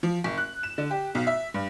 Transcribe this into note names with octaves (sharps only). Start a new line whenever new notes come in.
F3
F#1
F#6
E7
D3
G4
B1
E5
G2